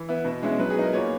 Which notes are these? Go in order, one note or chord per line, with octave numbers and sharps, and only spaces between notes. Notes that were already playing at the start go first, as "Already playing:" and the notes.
Already playing: E3
B3 E4
B2
G#3 C#4 E4
F#3 B4
G#4
B3 D#4 A#4
A#2 C#5